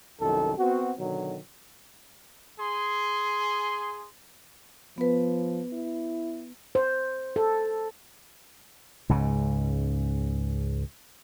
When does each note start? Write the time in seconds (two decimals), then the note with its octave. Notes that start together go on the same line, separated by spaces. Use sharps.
0.20 C2 F#2 D#3 A4
0.58 B3 C4 F#4
0.99 B2 D3 D#3 F#3
2.59 G#4 C6
4.98 F3 B3 B4
5.73 E4
6.75 C5
7.36 A4
9.09 C#2 G#2 C#3